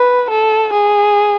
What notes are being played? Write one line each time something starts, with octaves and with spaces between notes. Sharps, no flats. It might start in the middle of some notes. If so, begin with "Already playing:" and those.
Already playing: B4
A4
G#4